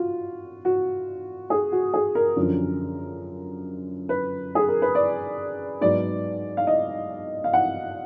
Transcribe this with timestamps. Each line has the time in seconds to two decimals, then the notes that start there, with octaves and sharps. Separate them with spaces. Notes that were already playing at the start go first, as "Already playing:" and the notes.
Already playing: F4 F#4
0.65 F#4
1.50 G#4
1.72 F#4
1.94 G#4
2.15 A#4
2.37 F#2 D3 F3
4.09 B4
4.55 G#4
4.68 A#4
4.82 B4
4.95 D5
5.81 G#2 F#3 B3 D5
6.57 F5
6.67 D#5
7.44 F5
7.53 F#5